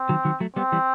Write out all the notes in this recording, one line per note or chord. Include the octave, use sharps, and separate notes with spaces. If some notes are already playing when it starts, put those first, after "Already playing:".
Already playing: C4
D#3 F#3
D#3 F#3
F#3 A3
G3 B3 C4
E3 G3